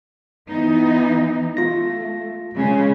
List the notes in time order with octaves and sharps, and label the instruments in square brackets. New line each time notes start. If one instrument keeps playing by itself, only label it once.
[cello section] E3 B3 D#4
[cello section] A3 [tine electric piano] F4 A#6
[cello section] C#3 G#3 C#4